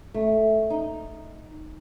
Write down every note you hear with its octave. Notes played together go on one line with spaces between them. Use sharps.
A3
D#4